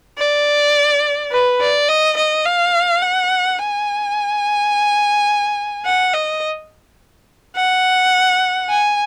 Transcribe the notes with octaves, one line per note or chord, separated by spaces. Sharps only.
D5
B4
D5
D#5
D#5
F5
F#5
G#5
F#5
D#5
F#5
G#5